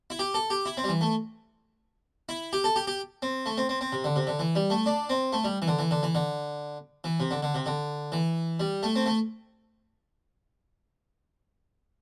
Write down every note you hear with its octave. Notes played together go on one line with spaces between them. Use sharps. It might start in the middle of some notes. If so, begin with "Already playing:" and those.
E4
G4
A4
G4
E4
C4
G3
E3
A3
E4
G4
A4
G4
G4
C4
A3
C4
C4
C4
C3
D3
C3
D3
E3
G3
A3
D4
C4
A3
G3
E3
D3
E3
D3
E3
D3
E3
C3
D3
D3
C3
D3
E3
G3
A3
C4
A3